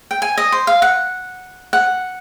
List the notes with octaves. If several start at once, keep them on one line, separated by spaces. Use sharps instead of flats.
G5
G#5
D#5
C5
F5
F#5
F#5